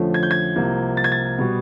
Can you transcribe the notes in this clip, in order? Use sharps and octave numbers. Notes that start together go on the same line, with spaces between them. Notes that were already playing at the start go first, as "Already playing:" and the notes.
Already playing: F2 D3 F3 A3 C#4
G#6
G6
G#6
C2 C3 F3 A#3
A6
G#6
A6
B2 G3 B3